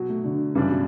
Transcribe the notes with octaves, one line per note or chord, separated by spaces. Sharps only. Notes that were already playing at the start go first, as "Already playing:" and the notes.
Already playing: B2 F#3 F#4
A3
D3
F#2 C#3 E3 G3 D4
B2